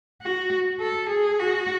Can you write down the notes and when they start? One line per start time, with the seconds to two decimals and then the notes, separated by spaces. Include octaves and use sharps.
0.22 F#4
0.80 A4
1.10 G#4
1.40 F#4